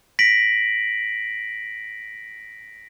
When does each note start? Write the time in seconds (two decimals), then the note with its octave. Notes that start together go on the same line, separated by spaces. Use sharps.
0.19 A#6 B6 D7 F#7